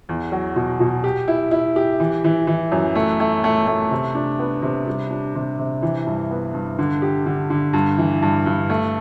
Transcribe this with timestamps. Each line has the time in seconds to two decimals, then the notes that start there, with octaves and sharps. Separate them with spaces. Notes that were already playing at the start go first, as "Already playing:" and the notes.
0.09 E2
0.32 F#3
0.56 B2
0.80 B2
1.04 G4
1.28 E4
1.51 E4
1.76 G4
2.00 E3
2.24 E3
2.47 E3
2.72 F#2
2.95 A3
3.20 A3
3.44 A3
3.67 A3
3.91 C3
4.15 D4
4.39 B3
4.62 C3
4.87 G3
5.10 D4
5.35 C3
5.59 C3
5.82 E3
6.06 G2
6.31 B3
6.54 G2
6.79 D3
7.02 G4
7.26 D3
7.50 D3
7.73 G2
7.98 E3
8.22 G2
8.46 G2
8.70 A3